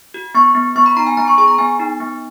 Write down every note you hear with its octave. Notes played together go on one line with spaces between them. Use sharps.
F#4
B3 C#6
B3
B3 C#6
B5
D#4 A#5
G#5
B3 A#5
C#6
G#4 C#6
A#5
B3 G#5
D#4
B3